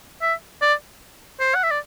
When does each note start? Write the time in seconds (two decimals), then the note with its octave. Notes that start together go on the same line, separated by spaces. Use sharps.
0.22 E5
0.62 D5
1.40 C5
1.55 F#5
1.63 E5
1.71 D5